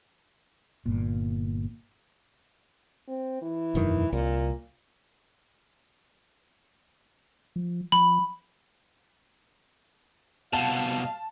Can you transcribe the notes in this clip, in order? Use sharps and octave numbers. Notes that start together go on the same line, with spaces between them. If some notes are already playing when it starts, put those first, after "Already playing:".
G1 A#2
C4
E3
E1 F#2 D#3
C2 A#2
F3
F3 B5
C2 B2 F5 A5